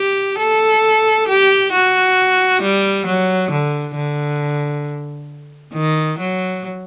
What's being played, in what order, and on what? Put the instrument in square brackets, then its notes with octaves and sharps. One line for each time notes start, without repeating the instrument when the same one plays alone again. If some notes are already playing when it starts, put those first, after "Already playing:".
Already playing: [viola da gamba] G4
A4
G4
F#4
G3
F#3
D3
D3
D#3
F#3